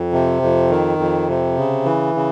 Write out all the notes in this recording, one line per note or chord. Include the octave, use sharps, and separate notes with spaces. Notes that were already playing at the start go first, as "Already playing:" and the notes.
Already playing: F2
C3
F2
D#3
F2
C3
C#3
E3
C#3